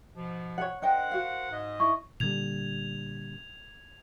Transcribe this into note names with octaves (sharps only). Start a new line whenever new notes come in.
G#2 B2 F3
C#5 F#5
D4 A#4 C5 D#5 F#5 G5
F#4 F5
G#2 D#5
E4 C#6
A#2 D3 G3 G#6 F7